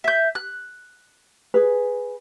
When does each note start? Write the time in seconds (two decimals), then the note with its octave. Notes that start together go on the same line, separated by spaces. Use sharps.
0.04 E5 G6
0.35 F#6
1.54 G#4 B4